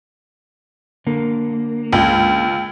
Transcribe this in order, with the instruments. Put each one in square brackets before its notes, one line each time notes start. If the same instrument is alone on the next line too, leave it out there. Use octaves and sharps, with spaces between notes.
[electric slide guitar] D3 A#3
[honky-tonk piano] C#2